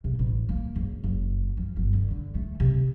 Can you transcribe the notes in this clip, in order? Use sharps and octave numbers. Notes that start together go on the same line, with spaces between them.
C3
A1
A#3
F#1
F#1
F3
G1
D3
D3
A3
C3